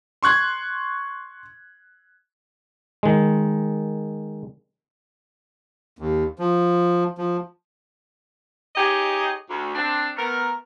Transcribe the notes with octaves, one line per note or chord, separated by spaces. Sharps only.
C6 C#6 F#6 G#6
D#3 G#3
D#2
F3
F3
D#4 G4 G#4 C#5 D#5
D2
C4 D4
A3 B3 A#4